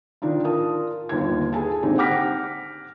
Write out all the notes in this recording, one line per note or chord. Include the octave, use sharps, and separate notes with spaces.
D#3 D4 D#4 F4
F4 A#4 A5 D#6
G1 D#2 F4 G#6
G#4 A4 G#5 A5
G#1 D3 C4 D#4 G4
F#5 G5 D6 F6 A#6 B6